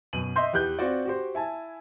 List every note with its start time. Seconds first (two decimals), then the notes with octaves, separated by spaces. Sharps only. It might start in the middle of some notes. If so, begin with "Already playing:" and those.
0.13 F#2 B2 D#7 F#7
0.36 D#5 E5 C6 G6
0.53 E2 G4 F#6 G6
0.79 C4 F4 F#4 D5
1.05 F#4 G4 C5
1.35 E4 G#5 A5